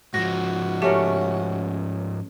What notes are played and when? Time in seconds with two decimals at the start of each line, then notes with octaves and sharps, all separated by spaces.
0.14 G#2 F3 F#4 A#6
0.82 A3 C#4 G4 A#4